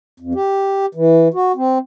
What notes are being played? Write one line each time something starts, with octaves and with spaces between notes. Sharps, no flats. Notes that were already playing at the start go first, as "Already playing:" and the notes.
F2
G4
E3
F#4
C4